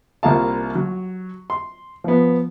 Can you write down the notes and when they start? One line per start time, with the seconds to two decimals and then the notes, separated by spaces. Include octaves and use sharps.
0.23 C2 A#3 F4 F5 A5
0.75 F#3
1.50 C6
2.04 F3 B3